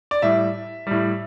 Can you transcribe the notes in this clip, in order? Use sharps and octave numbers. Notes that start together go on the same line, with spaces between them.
D5
A2 G3 E5
A2 G3